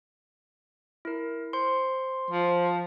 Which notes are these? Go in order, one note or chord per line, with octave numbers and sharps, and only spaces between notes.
E4 A#4
C5 C6
F3